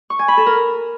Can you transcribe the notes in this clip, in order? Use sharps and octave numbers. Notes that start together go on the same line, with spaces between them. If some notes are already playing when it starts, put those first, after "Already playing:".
C#6
G#5
B5
A4
A#4